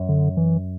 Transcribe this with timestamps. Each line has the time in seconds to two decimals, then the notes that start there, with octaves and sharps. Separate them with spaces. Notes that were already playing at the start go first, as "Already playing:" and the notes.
Already playing: F#2
0.09 D3
0.37 E3